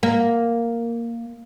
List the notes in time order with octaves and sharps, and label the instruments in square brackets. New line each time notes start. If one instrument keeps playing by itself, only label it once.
[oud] A#3